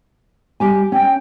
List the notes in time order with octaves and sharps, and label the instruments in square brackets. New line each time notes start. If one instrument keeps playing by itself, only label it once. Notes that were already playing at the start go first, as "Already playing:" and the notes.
[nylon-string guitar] G3 G4 G#5
[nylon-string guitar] C#4 [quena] G5